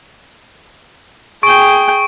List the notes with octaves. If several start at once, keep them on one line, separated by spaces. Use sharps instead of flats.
G#4 G5 C#6 D7